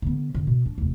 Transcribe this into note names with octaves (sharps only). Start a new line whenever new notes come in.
D3 B3
F#2 D3
B2
D4
F1 E2